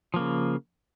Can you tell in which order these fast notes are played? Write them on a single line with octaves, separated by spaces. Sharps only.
F3 A#3 C#3